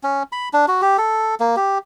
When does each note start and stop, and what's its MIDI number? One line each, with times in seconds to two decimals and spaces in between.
0.03 0.23 61
0.32 0.49 83
0.53 0.66 62
0.68 0.81 66
0.82 0.97 67
0.98 1.35 69
1.40 1.56 58
1.56 1.78 67